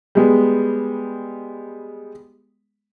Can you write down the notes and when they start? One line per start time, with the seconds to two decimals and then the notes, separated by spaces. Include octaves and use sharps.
0.15 G3 G#3 B3